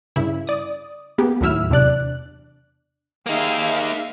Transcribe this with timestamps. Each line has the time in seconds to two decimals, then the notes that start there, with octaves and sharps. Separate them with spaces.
0.16 G2 C#3 E4
0.47 D5 D#6
1.18 A#3 B3 G4 G#4
1.41 D#2 A2 F#3 E4 E6 F6
1.70 E2 C3 D4 D5 F#6
3.26 A#3 D#4 G#4 E5 F5